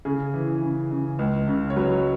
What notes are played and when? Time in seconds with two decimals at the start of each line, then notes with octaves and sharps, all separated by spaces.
0.05 C#3 G#4
0.34 E3
0.62 C#3
0.91 C#3
1.19 C#2
1.48 C#3
1.70 C#5
1.76 F#3 B4